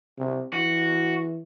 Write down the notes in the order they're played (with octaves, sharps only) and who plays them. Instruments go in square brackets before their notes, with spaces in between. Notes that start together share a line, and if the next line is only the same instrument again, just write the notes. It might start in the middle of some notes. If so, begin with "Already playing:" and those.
[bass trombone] C3
[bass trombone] E3 [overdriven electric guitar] F#4